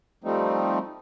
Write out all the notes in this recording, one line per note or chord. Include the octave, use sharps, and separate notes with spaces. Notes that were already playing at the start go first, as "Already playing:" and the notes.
F3 G3 A3 C4 D#4